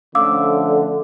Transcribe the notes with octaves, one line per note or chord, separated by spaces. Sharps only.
D3 F3 A3 C#4 F5 D6 E6